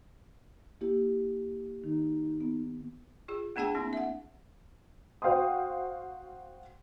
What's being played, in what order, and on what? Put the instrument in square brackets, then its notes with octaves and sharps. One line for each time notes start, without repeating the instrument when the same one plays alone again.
[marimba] A#3 E4 G4
[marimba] D#3 [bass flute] D#4
[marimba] B3
[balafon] F4 G#4
A3 B3 D4 G#4 G5 A5
A#3 C4 D4 E4
E5 F#5
[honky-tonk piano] F#4 C5 F5 G5 C6 D#6